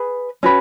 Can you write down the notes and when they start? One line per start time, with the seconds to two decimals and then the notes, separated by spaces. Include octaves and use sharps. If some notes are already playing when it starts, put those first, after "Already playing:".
Already playing: G#4 B4
0.43 C#4 F#4 B4